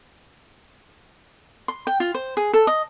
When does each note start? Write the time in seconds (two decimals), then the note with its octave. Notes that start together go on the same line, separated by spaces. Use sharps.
1.68 C6
1.87 G5
2.00 F4
2.15 C5
2.37 G#4
2.53 A4
2.67 D#5